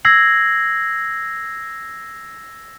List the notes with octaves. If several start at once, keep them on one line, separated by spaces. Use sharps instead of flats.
E6 G#6 A#6 C7 F#7